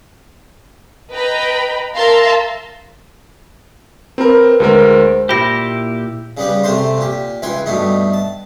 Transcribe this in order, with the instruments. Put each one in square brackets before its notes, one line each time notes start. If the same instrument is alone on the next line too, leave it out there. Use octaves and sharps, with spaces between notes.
[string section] B4 D#5 G5 A#5 B5
A#4 E5 F5 A5 A#5 C6
[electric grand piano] C4 A#4 [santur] B4
[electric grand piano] D2 G#3 A#4 [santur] C5 D6
[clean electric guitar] A#2 E4 G4 [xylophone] B5 A#6
[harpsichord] C#3 G3 B3 G4
C3 A3 C5 A#5 C6
A#2 G4
C#2 E3 G5 G#5 C6
G2 B2 A3 D#4
A5